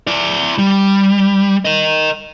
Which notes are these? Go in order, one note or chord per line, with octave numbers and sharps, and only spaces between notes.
E4 D5
G3
A#4 D#5